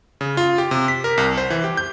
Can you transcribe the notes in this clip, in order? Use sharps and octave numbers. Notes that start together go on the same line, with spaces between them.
C#3
F4
G4
C3
B6
A#4
C2
C5
E3
G4
G6